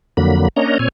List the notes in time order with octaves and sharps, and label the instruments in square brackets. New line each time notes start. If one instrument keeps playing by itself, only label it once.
[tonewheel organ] F2 D3 F#3 A#3 B5
A#3 C#4 D4 C#5 D#5 A#5
A#2 C4 C#5 G#5